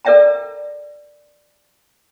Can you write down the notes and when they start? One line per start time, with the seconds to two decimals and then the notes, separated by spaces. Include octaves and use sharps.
0.05 A4 A#4 D5 E5 G5 A#5